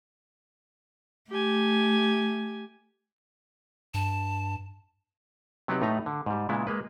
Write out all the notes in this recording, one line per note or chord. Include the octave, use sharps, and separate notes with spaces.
A3 G4 G#5
G2 A5
C3 F#3 B3 D#4 G4 B4
A2 A3 D#4 B4 A#5
D3
G#2 G3
A#2 C#3 G#3 B3 E4
G#3 A#3 B4